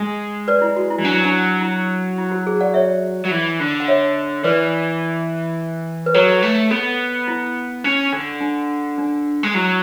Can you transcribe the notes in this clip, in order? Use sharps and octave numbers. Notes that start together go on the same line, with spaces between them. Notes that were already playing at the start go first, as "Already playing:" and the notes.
Already playing: G#3
B4 D5
E4
F#4
E4
E3
F#3 D4
E4
D4
E4
E4
F#4
G#4
D5 F#5
C#5 E5
F#3
E3
D3
F#5
C#5 E5
E3 B4 D5
B4
F#3 A4 C#5
A3
B3 A4
E4
C#4
D3
D4
D4
G#3
F#3 E4